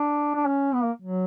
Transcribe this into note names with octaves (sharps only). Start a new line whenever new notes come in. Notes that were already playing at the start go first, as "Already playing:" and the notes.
Already playing: D4
D4
C#4
B3
A#3
F#3